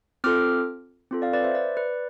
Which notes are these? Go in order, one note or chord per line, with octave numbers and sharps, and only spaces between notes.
C4 F4 A4 D6 F6
C4 F4 A4
D5 F5
B4 D5
C5 E5
B4 D5
B4 D5